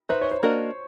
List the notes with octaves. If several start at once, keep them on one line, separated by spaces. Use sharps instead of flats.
D#4 F#4 B4 C5 E5
C#5
C5
A#3 D4 F#4 A#4 D#5